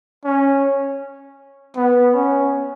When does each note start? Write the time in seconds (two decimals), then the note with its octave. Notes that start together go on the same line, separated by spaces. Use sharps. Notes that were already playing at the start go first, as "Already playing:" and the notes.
0.25 C#4
1.76 B3
2.14 C#4